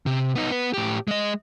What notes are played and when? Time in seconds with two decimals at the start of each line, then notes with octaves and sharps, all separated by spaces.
0.06 C3
0.35 B3 D#4
0.51 B3 B4
0.74 A2 G4
1.08 G#3 D#5